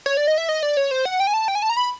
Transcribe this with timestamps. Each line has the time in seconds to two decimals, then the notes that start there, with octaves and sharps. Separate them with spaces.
0.06 C#5
0.17 D5
0.27 D#5
0.38 E5
0.49 D#5
0.63 D5
0.77 C#5
0.91 C5
1.05 F#5
1.20 G5
1.27 G#5
1.34 A5
1.48 G5
1.55 G#5
1.62 A5
1.70 A#5
1.77 B5